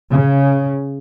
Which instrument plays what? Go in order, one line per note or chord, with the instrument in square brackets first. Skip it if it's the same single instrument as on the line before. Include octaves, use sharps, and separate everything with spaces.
[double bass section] C#3